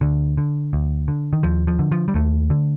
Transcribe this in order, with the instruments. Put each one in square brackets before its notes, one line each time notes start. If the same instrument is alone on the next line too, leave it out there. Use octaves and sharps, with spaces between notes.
[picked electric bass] D2 D3
D3
D2
D3
D#3
D#2 F3
F3
D3
F3
G3
D#2 A3
D3